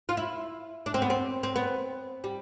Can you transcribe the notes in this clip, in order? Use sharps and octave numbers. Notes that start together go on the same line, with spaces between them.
F4
E4
D4
C4
B3
C4
C4
B3
G3